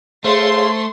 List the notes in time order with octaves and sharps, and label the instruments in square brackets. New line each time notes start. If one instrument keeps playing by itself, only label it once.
[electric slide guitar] A3 [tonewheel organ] G#4 C#5 F5 [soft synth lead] C5 [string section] C6